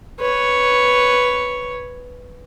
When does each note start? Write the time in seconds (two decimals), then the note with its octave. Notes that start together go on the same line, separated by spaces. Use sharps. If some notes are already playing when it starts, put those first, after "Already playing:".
0.20 B4 C#5